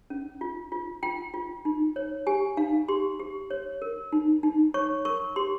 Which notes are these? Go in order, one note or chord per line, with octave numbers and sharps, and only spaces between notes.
C#4
F4
F4
F4 G5
F4
D#4
C#5
G4 G#5
D#4 F5
G4 C6
G4
C#5
A#4
D#4
D#4
C#5 C#6
A#4 C#6
G4 C6